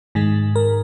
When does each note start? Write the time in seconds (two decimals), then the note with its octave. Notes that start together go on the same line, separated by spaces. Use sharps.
0.15 G#2 D#3 G#3
0.56 A#4